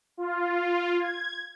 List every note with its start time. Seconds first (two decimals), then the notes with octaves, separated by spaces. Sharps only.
0.17 F4
0.99 G#6